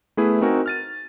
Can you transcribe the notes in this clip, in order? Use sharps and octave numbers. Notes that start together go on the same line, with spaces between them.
A3 B3 E4 G#4 B4
C4 D#4 F#4 A#4 G#5
F6 A6 D#7